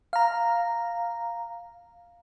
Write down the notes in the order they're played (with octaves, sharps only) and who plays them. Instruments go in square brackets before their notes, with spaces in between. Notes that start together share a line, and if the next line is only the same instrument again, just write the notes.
[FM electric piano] F5 A#5